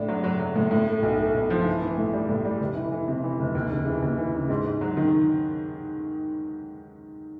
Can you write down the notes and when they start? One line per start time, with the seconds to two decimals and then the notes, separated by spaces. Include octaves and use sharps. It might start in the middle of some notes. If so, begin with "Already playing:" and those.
Already playing: A2 D4
0.08 F#3
0.24 F#3
0.40 F#3
0.56 A2
0.71 A2
0.87 A3
1.03 B1
1.19 A3
1.34 B1
1.50 F3
1.66 E3
1.82 E3
1.98 A2
2.13 G3
2.29 A2
2.45 G3
2.61 F1
2.76 E3
2.92 E3
3.08 C3
3.24 E3
3.39 F1
3.55 D#2
3.71 C#3
3.86 E3
4.02 D#2
4.18 E3
4.34 C#3
4.50 G#2
4.66 G#2
4.81 F#3
4.97 D#3